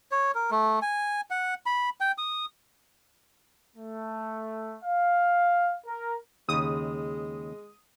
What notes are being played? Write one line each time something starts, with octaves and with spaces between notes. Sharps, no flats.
C#5
A#4
A3
G#5
F#5
B5
G5
D#6
A3
F5
A#4
D#2 C#3 G#3 D#6